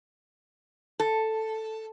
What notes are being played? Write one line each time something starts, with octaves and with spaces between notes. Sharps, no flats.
A4